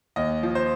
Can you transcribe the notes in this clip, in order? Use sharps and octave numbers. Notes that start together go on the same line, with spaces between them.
D#2 D#5
F3
C5